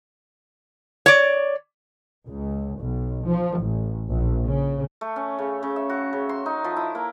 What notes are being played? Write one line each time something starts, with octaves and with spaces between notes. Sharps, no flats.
C#5 D5
C#2
B1
F3
A1
A#1
C#3
A3
C#4
C#3
C#3
E5
F#4
C#3
C6
D#4
F3
E4
A#3